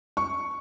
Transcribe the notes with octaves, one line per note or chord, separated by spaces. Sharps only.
C#6